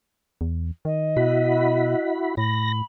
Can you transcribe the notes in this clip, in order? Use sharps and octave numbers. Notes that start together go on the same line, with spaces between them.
E2
D#3 D#5
B2 E4 F#4 B5
A2 B5 A#6